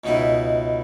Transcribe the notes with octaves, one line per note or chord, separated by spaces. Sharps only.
C#2 B2 B3 D#4 E4